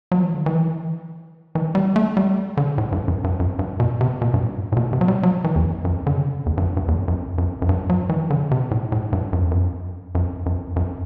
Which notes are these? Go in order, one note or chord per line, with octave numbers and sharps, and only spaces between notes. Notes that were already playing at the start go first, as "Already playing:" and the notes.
F#3
E3
D3
E3
E3
G3
A3
G3
D3
A2
G2
F#2
G2
F#2
G2
B2
C3
B2
G2
A2
A2
B2
C3
F#3
G3
F#3
E3
E2
F#2
F#2
D3
C3
E2
G2
F#2
G2
E2
F#2
F#2
F#2
F#2
G2
F#3
E3
D3
C3
A2
A2
G2
F#2
E2
F#2
F#2
F#2
F#2